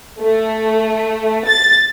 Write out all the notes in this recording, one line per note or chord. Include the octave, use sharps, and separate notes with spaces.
A3
A6